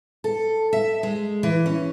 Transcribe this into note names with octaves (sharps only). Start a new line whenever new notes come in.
A4
E5
G#3
E3
C#4